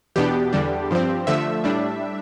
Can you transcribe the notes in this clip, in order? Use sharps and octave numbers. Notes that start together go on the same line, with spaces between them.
E2 B2 B3 D4 G4
E2 D3 G3 D4
G2 F3 C4
D3 F3 A3 E5
A2 G3 D4